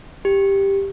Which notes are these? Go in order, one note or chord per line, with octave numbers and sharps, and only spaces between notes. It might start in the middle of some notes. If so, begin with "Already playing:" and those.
G4